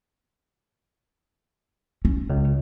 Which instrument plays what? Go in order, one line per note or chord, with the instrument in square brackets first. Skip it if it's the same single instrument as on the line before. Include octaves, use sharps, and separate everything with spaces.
[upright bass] C#4
[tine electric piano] C#2